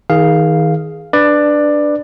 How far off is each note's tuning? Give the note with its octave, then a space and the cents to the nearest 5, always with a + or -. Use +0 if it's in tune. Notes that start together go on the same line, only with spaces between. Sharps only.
D#3 +35 G#4 +0 F5 +0
D4 +0 B4 +0 D5 +15